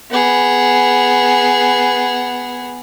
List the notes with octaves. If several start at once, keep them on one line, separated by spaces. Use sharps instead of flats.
B3 G#4